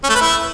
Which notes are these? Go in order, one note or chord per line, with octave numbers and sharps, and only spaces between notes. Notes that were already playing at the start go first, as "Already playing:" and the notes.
C#4
A3
B4
E4